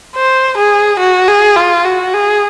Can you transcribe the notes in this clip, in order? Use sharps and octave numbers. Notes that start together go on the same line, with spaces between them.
C5
G#4
F#4
G#4
F4
F#4
G#4